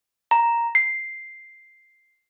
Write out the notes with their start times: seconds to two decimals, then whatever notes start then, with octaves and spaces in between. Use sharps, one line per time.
0.31 A#5
0.75 C7